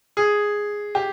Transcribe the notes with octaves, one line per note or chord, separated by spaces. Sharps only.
G#4
G4